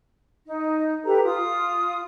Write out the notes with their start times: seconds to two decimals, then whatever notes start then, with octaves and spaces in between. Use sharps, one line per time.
0.46 D#4
1.04 G4 A4 B4 A#5
1.24 F4 D#6